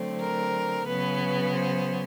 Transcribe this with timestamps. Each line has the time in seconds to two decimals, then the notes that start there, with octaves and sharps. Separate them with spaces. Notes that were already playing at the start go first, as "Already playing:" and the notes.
Already playing: D3 F#3 A3 C4
0.20 A#4
0.87 C#3 F#3 B3 B4
1.53 C5